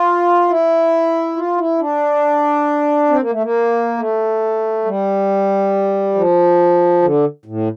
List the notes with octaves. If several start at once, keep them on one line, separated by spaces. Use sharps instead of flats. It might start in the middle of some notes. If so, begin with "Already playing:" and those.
Already playing: F4
E4
F4
E4
D4
C4
A#3
A3
A#3
A3
G3
F3
D3
A2